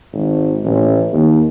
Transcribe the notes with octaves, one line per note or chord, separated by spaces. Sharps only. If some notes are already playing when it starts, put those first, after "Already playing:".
G#1
A1
D#2